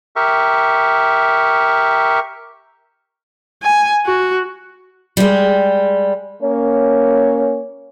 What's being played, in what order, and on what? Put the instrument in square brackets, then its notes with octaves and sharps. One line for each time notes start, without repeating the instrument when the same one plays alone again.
[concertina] G4 A#4 E5 C#6
[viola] G#5
F#4
[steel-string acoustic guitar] G3 G#3
[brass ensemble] A#3 C#4 C#5